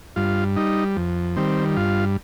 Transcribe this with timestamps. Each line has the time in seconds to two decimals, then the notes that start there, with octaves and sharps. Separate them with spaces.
0.16 G2 F4
0.56 G3 D#4
0.96 F2
1.36 D#3 G3 C4
1.77 G2 F4